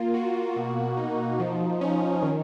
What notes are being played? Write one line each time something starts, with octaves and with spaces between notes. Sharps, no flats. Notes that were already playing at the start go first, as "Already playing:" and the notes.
Already playing: A#3 F4
F#4
B2
D#4
F3
C#4
D#3